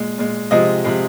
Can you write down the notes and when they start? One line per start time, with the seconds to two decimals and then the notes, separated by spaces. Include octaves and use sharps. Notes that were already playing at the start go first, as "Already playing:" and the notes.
Already playing: A#2 G#3
0.18 A#2 G#3
0.51 C3 F3 G#3 D#5
0.84 C3 F3 G#3